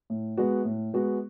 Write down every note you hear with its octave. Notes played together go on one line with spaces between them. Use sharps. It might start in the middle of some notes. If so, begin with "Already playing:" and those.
A2
G#3 B3 F#4
A2
G#3 B3 F#4